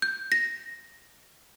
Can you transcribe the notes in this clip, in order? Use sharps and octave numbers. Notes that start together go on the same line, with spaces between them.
G6
A#6